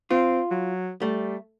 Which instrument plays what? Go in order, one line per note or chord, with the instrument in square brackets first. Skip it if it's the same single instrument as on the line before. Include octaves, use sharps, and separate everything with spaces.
[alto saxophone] C4 [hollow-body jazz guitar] F4
[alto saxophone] F#3
[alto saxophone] G3 [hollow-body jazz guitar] A3